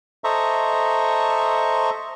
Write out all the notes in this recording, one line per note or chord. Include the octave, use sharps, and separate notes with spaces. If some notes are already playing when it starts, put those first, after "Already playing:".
A4 C5 D#5 E5 A#5 C#6